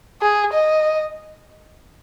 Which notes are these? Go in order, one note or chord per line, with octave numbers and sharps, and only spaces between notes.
G#4
D#5